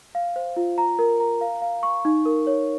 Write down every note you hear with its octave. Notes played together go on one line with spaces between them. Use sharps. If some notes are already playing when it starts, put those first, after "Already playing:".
F5
C5
F4
A#5
A#4
A#5
F5
F5
C#6
D#4
A#4
C#5